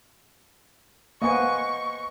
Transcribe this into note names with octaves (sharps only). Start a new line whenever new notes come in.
A#3 B3 C5 D#5 G#5 C#6